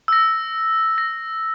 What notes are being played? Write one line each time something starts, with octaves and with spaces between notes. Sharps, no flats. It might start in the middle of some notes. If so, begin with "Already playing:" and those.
E6 A#6
A#6